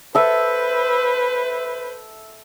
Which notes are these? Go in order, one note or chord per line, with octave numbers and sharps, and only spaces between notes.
A4 B4 C5 E5